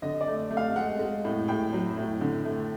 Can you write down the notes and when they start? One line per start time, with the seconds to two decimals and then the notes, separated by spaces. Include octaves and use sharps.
0.02 D3 D#5
0.21 D5
0.27 A3
0.51 A3
0.57 F5
0.76 G#3 F#5
0.99 G#3
1.25 A2
1.48 A2 G5
1.73 F#3
1.97 A2
2.21 D3
2.45 A3